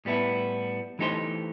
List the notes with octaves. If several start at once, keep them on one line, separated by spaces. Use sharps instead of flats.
A2 G3 B3 E4
E3 A3 D#4 G4 C5